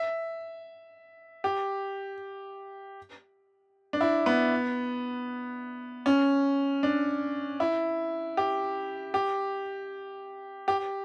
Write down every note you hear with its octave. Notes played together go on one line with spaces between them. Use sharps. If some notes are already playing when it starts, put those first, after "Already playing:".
Already playing: E5
G4
D4
E4
B3
C#4
D4
E4
G4
G4
G4